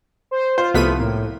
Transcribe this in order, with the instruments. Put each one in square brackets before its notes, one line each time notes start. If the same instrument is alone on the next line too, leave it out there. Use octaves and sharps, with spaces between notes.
[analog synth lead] C5
[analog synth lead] F4 [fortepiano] C5
[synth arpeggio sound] C2 B6 D#7 [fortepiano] F3 A3 B3
[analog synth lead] A2 [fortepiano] A#3